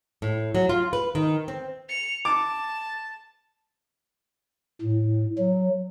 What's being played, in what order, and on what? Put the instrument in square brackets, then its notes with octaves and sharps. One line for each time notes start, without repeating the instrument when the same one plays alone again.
[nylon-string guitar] A2
F#3
F4
B4
D#3
C4
[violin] C#7 F7
[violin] A5 [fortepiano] D6
[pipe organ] A2
F#3